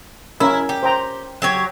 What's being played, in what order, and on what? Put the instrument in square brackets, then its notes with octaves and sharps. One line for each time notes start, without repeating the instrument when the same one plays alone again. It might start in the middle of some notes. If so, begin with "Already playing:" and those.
[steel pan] C#4 A#4 E6 [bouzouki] E4
[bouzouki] G4
[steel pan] C5 G5 A#5
[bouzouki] F#3 G4 C#5